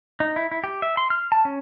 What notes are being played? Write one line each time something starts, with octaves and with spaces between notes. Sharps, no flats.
D#4
E4
E4
G4
E5
C6
F6
A5
C#4